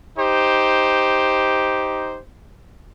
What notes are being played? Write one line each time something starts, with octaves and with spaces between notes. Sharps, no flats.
D#4 G4 C5